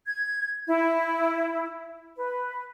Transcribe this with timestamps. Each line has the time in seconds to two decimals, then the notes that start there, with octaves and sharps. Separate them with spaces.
0.06 G#6
0.67 E4
2.16 B4